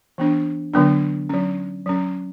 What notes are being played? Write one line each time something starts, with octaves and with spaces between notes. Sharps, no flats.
E3 B3 D4
D3 F#3 B3 D4
F#3 C#4
F#3 C#4